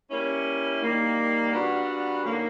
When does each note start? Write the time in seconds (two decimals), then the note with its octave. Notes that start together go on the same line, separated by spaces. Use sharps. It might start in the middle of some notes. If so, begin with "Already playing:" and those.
0.10 G3 A#3 C#4 E4
0.80 D#3 G3 A#3
1.52 A#2 G3 B3 D4 F#4
2.23 D3 F#3 A#3 D#4